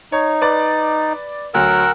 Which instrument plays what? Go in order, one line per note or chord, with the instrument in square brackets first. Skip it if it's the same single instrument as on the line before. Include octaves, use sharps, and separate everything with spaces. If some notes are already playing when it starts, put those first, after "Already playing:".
[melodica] D#4 [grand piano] C#5
[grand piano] B4 D5
[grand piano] D2 F#3 [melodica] A#4 F#5 E6